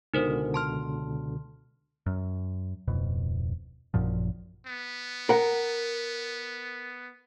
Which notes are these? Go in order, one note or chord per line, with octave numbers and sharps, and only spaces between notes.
C#2 B2 D3 D#4 A#4 C5
A5 C6 F6
F#2
D1 F2 B2
A1 F#2 A#2 F3
B3
A#4 F#5